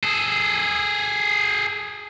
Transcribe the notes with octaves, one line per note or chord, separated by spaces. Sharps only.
G#4 A4